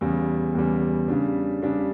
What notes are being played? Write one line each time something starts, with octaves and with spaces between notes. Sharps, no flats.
E2 C#3 G3
E2 C#3 G3
C#3 G3 D4
C#3 G3 D4